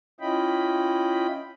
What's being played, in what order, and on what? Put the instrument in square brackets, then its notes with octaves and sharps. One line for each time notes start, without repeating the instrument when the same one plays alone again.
[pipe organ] C#4 E4 F4 D#5 G5 B5